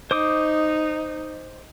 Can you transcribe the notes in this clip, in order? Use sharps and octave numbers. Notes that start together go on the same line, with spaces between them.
D#4 C5 D6 D#6